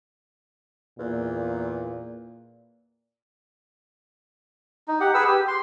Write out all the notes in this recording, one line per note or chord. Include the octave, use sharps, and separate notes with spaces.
E2 A#2
D#4
G4 F#5
G#4 B4 B5 E6
G4
C6